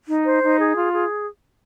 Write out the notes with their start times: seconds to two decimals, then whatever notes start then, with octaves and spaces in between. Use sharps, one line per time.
0.09 D#4
0.26 C5
0.43 D#4
0.59 G#4
0.75 F4
0.92 G#4